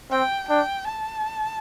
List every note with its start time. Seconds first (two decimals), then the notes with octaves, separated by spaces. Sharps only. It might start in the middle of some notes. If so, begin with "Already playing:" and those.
0.11 C4 G5
0.48 D4 G5
0.87 A5